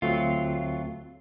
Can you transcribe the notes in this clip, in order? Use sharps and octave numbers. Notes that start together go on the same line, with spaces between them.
D2 F#3 A3 C4 F4